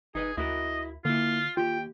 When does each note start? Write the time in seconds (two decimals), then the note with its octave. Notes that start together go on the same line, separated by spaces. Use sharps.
0.15 G1 D#4 G#4 B4 D#5
0.38 D2 E4 F#4 A#4 D#5
1.05 D3 A#3 E4 F4
1.57 D#2 F4 G4 G5